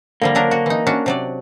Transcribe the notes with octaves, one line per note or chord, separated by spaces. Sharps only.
D3 F3 G3 A#3
F#3 D4 A#4
F#4
E3 D#4
C#4 D4 F#4
C3 F#3 D5